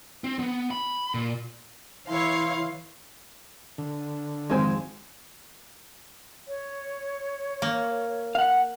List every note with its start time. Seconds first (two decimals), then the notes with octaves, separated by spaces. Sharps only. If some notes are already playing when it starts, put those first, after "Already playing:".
0.24 C4
0.39 B3
0.71 B5
1.14 A#2
2.08 E3 E4 C#5 F5 C6
3.78 D3
4.50 G#1 F2 G#3 C4 G#5
6.48 C#5
7.62 A#3
8.35 F5 F#5